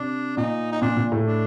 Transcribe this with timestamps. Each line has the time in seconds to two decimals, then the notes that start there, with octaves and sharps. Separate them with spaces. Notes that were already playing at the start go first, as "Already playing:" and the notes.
Already playing: C3 D4
0.37 A#2 D#4
0.72 D#4
0.82 A#2 D4
0.97 A#2
1.12 A2
1.26 D4